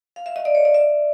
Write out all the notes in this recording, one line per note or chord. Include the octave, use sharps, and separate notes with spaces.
F5
E5
D#5
D5
C#5
D5
E5